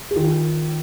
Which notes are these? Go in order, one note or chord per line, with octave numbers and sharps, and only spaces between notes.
G#4
D#3 F4